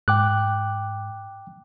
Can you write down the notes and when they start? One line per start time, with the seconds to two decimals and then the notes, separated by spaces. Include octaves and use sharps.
0.08 G#2 G5 D6 F#6